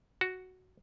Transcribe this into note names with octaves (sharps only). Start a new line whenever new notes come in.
F#4